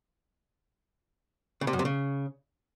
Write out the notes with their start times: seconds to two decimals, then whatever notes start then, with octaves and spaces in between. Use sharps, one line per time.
1.61 C#3
1.67 C3
1.73 F#2
1.79 C3
1.85 C#3